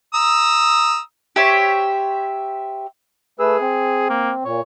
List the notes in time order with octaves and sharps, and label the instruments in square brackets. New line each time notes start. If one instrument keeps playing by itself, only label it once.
[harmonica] A#5 D#6 E6
[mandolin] G4 C5 C#5 E5
[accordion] A3 B4 E6 [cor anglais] G#4
[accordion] C4
[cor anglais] A#3
[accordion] A#2 [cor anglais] C#5